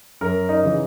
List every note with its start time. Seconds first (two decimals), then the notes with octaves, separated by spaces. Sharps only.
0.21 F#2 A#4
0.49 D#4
0.63 C#3 E3